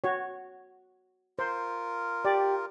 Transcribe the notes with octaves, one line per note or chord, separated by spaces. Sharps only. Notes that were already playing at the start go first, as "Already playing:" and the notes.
F#4 C#5
F4 A#4 C5
G4 D5